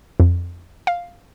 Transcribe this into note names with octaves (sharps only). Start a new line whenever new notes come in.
F2
F5